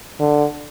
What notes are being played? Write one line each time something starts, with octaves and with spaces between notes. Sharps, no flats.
D3